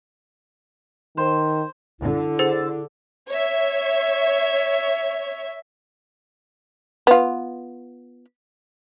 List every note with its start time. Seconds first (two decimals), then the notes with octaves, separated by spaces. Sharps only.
1.17 D#3 C5
2.00 D3 E4
2.39 G#4 C5 F#5 E6 A6
3.29 C#5 E5
7.07 B3 F4